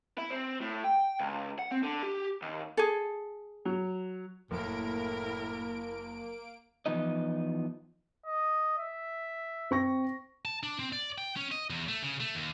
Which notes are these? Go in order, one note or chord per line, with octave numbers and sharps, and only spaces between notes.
E4
C4
A2
G5
C#2
F#5
C4
D3
G4
D#2
G#4 A4
F#3
F#1 A2 A#3 E4 A#4 D7
E3 F3 B3 D#4 D#5
D#5
E5
C4 C#6 A#6
A5
D4
C4
D5
G5
C#4
D#5
E2
A3
C#3
A3
D#2